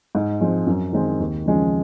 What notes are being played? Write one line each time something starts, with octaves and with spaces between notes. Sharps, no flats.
G#2
F3 G#3 C4
F#2
D#3 G#3 C4
D#2
C#3 F3 G#3 C#4